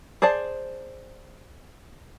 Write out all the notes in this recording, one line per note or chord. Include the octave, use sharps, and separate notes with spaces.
G#4 C5 D5 A5